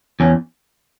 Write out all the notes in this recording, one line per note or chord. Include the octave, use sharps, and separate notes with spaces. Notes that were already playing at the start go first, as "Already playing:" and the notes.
E2 C#4